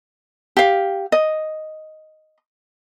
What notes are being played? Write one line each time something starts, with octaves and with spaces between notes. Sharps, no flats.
G4 F5
D#5